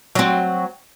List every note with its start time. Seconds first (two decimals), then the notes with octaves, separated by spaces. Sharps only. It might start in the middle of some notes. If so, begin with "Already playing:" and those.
0.15 F#3 C4